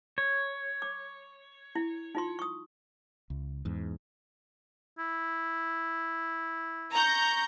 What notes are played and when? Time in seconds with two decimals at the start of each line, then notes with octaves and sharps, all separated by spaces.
0.18 C#5
0.82 D6
1.75 E4
2.15 D#4 F4 C6
2.39 C#6 D#6
3.30 C#2
3.65 E2 G#2
4.99 E4
6.92 A#5 C#6 G6